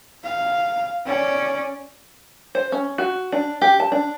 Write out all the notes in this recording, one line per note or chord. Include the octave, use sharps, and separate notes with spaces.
F5
C#4 D5
C5
C#4
F#4
D4
G4
A5
D4